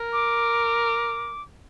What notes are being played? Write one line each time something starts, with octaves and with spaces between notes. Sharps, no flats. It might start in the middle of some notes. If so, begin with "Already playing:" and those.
Already playing: A#4
D6